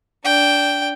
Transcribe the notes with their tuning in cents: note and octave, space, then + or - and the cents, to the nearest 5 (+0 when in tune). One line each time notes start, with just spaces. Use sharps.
D4 -20 G5 +0